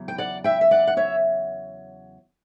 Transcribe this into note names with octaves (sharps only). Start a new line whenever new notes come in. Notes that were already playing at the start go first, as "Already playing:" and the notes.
Already playing: E2 C#3 F#3
G5
D5 F#5
E5 G5
E5
D5 F#5
F#5
C#5 E5